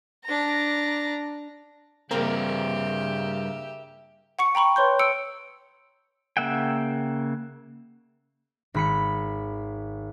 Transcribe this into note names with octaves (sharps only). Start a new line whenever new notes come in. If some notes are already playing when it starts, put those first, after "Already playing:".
D4 A#5
G2 C#3 A#3 C4 G4 A#4 E5
F#5 C#6 C#7
G5 A#5 B5 C#6
B4 C#5 C6 G6
E6 C#7 D7
C#3 A#3 E5 F#5 G5
G#1 B5 C#7